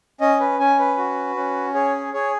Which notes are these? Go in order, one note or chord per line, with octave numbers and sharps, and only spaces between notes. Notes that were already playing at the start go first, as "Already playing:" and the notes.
C#4 D#5
B4
C#4 G#5
B4
F#4
C#4
G#4 C#5
G#4 C#5